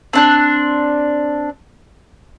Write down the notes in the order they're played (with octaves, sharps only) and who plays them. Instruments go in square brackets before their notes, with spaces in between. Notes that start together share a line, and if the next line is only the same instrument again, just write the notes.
[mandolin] C4 D4 F#6